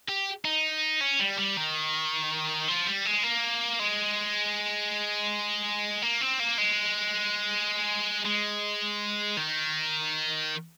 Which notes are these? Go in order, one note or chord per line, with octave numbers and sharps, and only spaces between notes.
G4
D#4
C#4
G3
G3
D#3
F3
G3
G#3
A#3
G#3
A#3
C4
A#3
G#3
G#3
D#3